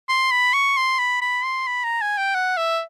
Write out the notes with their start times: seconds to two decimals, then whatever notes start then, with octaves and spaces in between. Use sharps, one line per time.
0.09 C6
0.32 B5
0.54 C#6
0.77 C6
0.99 B5
1.22 B5
1.44 C6
1.67 B5
1.84 A#5
2.01 G#5
2.18 G5
2.35 F#5
2.57 E5